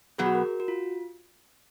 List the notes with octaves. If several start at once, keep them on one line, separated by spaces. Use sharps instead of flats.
B2 F#3 B3 G#4
F#4
A#4
F#4
F4